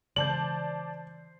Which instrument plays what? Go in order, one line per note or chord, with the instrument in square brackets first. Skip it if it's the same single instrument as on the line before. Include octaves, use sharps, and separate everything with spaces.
[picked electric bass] C#3 E3 G#3 [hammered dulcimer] C5 [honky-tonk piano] D5 A5 G6 [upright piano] F#7